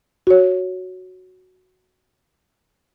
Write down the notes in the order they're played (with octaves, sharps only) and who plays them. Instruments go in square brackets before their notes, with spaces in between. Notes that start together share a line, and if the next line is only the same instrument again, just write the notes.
[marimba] F#4 C#5